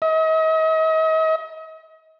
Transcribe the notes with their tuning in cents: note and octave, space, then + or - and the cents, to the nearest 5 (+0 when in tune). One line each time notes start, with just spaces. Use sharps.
D#5 +40